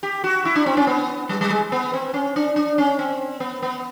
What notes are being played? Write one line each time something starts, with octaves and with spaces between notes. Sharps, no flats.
G4
F#4
E4
D4
C4
C#4
B3
G3
G3
G#3
B3
C4
C#4
D4
D4
C#4
C4
B3
B3